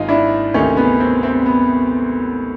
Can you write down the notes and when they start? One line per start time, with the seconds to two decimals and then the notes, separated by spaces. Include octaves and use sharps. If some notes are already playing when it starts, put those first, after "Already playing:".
Already playing: G#1 G#2 D#4 F4
0.09 D4 E4
0.54 D2 C3 D#3 C#4 D#4
0.77 B3 C#4
1.00 C4
1.23 C4
1.46 B3